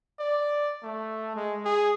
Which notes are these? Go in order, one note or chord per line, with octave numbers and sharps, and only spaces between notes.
D5
A3
G#3
G#4